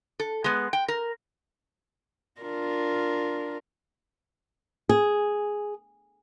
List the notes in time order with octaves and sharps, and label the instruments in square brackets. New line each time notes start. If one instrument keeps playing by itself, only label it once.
[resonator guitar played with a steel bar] A4
G#3 B3
G5
A#4
[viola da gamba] D4 F4 A#4
[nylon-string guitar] G#4